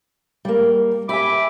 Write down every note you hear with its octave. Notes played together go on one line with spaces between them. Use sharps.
G3 A#3
G4 E5 G#5 B5 D6